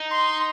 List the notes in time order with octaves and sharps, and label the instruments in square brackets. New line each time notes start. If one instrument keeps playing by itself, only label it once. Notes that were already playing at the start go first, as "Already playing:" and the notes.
Already playing: [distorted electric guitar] D#4
[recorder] C6